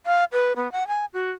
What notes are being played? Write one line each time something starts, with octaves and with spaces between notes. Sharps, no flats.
F5
B4
B3
F#5
G#5
F#4